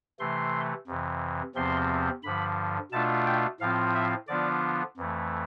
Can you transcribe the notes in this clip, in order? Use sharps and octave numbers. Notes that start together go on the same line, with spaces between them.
C3 E3 A3 C6
F2 C3 E3
E2 C3 F3 C4 C6
G2 D3 F3 B5
B2 A3 D4 F4 A5
G5
A2 F3 C4 F4 F5
E5
D3 F3 B3 D4 F4 D5
F2 E3 A3